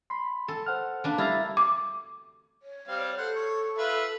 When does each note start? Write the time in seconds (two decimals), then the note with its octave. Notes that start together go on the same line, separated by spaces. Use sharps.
0.10 B5 C6
0.48 A4
0.66 C5 F#5 F6
1.04 A#3 D4 B4
1.18 G3 E4 F5 A#5 F6 A6
1.57 D6
2.62 C#5
2.88 G3 C4 F5
3.17 A4 C5 F#5
3.35 C#5
3.78 F4 B4 E5